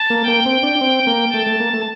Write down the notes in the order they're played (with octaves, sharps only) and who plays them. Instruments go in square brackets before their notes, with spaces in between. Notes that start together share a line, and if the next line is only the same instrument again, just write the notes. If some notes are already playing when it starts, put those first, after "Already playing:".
Already playing: [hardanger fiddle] A5
[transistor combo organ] A#3
[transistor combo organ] A#3 [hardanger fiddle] G5
[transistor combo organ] C4
D4
C4
A#3
[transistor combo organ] A3 [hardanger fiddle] A5
[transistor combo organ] A3
A#3
A3